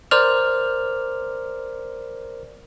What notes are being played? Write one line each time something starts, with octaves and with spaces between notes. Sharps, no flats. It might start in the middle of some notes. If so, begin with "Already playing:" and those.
A#4 C5 D5 F6